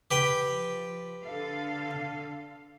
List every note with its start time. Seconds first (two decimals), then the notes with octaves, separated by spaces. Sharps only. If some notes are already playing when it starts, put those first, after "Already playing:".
0.11 G4 B4 G5
0.44 F3
1.25 D3 A4 F5